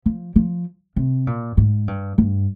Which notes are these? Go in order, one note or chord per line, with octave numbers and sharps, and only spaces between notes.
F3
F3
C3
A#2
G#2
G2
G2